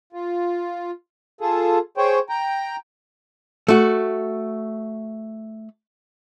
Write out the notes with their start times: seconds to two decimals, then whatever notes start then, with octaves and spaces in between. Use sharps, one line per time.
0.13 F4
1.41 F4 G#4 A4
1.97 G#4 C5 C#5 G5
2.29 G5 A#5
3.68 A3 F#4